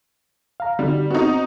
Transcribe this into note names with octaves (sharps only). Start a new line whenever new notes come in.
F5 A#5
D3 G3 D#4 F#4
B3 C4 D#4 F#4